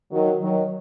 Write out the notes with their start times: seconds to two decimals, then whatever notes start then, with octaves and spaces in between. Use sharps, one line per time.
0.12 D#3 F#3
0.41 D#3 F#3